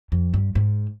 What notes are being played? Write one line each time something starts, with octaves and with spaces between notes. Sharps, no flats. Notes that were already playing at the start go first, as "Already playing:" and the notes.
F2
G2
G#2